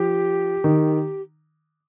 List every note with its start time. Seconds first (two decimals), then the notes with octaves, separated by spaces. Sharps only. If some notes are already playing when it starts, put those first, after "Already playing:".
Already playing: F3 G4
0.64 D#3